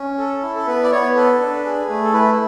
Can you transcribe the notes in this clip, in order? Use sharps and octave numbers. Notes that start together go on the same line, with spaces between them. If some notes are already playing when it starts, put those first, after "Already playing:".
Already playing: C#4
A4
E4
A4
B3 B4
D5
B3 C#5
A4 B4
D4
G#4
A3
A4
E4 B4